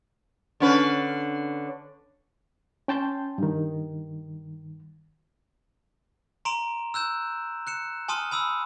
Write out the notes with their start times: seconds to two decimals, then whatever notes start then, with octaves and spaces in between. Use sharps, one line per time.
0.60 D3 C#4 B4
2.88 C#4 G5 A5 C6 G6
3.38 G2 D#3
6.45 A#5 C6 D7 E7 F7
6.94 E6 F#6 G6 E7
7.67 F#6 C#7 E7
8.08 G#5 A5 C6 D#6 F6 D#7
8.31 G#5 B5 D#6 E6